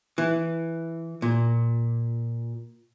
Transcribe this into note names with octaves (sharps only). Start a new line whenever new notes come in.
E3
A#2